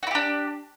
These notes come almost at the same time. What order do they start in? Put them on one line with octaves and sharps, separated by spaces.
F#4 E4 G4 D4